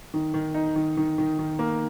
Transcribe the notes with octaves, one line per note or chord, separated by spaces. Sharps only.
D#3
D#3
D#4
D#3
D#3
D#3
D#3
A#3